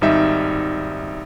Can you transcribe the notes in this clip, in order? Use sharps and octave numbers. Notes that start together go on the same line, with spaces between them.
G#1 G3 D#4 E5